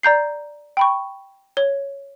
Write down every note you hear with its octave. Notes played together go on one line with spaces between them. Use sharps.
D5 A#5 G6 C7
G5 B5 C#6
C#5 G7